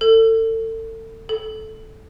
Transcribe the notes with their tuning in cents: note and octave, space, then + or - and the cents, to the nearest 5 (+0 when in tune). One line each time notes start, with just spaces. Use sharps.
A4 +35
A4 -10